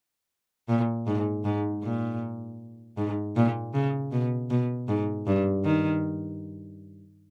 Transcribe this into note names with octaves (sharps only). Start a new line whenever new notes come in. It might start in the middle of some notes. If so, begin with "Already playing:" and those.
A#2
G#2
G#2
A#2
G#2
A#2
C#3
B2
B2
G#2
G2
D#3